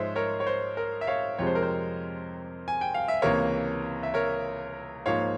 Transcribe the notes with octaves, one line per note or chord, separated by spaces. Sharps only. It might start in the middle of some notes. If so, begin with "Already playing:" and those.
Already playing: G#2 F3 G#3 C5 C#5 E5
A#4 C#5
C#5
C5
A#4
E5
C#5 F5
F2 C3 F3 G#3 C#5
C5
A#4
C5
G#5
G5
F5
E5
C#2 C3 E3 A#3 A#4 C#5
E5
A#4 C#5
G#2 F3 A#3 C#5 F5